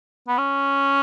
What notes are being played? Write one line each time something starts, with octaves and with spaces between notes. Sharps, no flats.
B3
C#4